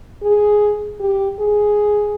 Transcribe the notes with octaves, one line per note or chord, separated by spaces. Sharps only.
G#4
G4
G#4